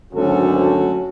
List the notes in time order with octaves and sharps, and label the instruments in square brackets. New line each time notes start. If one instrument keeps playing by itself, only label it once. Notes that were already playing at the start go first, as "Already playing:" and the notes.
[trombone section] G#1 D2 A4 [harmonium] F#3 C#4 F#4